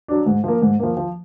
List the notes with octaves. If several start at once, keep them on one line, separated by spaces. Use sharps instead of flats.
F#3 D4
G#2
F3 A#3
G#2
F3 A#3
F3